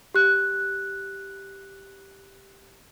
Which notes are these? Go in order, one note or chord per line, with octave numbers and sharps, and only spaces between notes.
G4 F#6